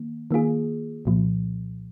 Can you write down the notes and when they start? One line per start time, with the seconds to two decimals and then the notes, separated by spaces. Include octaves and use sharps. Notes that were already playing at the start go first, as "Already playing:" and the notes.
Already playing: D#3 A#3
0.31 D#3 A#3 F4 G#4
1.05 C2 A#2 F3